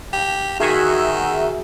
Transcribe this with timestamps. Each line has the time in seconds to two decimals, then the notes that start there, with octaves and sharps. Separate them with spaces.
0.13 G4
0.60 D#3 F#4 G#4 E5